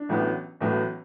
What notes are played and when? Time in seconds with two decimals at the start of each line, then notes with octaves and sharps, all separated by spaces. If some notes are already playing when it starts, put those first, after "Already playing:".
Already playing: D4
0.09 A1 A2 F#3 B3
0.61 A1 A2 F#3 B3